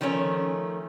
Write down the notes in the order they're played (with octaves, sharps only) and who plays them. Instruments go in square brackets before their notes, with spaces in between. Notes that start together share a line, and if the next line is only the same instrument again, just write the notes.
[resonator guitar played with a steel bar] D#3 F3 A3 C#4